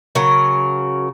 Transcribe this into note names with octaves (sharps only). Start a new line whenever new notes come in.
C#3 F#3 A#4